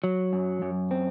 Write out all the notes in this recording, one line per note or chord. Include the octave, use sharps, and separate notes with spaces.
F#3
F#2
F#2
C4